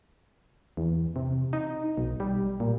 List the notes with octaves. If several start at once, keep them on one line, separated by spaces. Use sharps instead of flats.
E2
C3
D#4
B1
G3
A#2